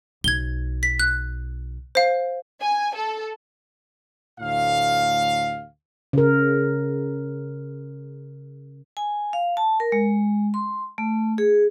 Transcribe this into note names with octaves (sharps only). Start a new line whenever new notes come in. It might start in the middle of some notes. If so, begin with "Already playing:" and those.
B1 G#6 G7
B6
F#6
C5 F5
G#5
A4
D2 A2 F5
C#3 A#4
G#5
F5
A5
A#4
G#3
C6
A3
G#4